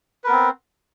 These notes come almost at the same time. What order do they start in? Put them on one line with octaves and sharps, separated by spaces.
B4 A#4 B3 C4